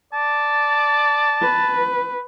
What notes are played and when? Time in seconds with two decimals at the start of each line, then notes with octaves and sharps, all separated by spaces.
0.13 D5 A5
1.42 B4